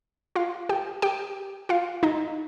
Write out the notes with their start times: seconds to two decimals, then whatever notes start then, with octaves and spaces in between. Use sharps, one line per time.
0.36 F4 F5
0.69 G4 G5
1.02 G4 G5
1.69 F4 F5
2.03 D#4 D#5